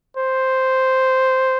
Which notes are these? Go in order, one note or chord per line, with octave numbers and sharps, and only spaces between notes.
C5